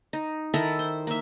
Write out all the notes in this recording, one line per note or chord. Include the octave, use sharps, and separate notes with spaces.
D#4
D#3 E4 A4 A#5
C5
A#3 E5